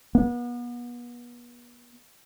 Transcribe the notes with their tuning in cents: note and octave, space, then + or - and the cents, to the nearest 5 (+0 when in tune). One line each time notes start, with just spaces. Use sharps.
B3 -35